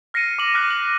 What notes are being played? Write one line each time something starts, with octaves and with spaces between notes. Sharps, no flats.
F6 A#6 C7 C#7 D#7
D6 F#7
D6 F6 F#6 A#6 D#7
F#7